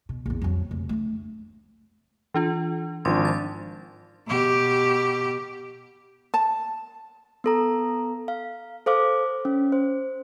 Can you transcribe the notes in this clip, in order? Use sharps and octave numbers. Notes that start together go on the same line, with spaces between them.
B2
A#1 E2
F2 F#3
F1
A3 D4
E3 D4 F4
G#1 F3 D4 C6
A6
B2 G4
A5
B3 A4 A#5
F5
A4 C5 F5 D6
C#4
C5